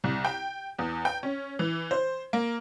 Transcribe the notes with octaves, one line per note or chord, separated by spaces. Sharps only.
C2
G5
E2
G5
C#4
E3
C5
A#3